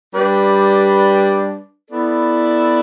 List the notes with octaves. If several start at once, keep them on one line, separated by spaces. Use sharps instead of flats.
G3 D4 G4 B4
B3 E4 A4 D5